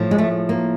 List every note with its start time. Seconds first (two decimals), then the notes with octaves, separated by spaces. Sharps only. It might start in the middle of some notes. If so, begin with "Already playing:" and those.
Already playing: A2 F3
0.11 G#3
0.18 A3
0.49 A#3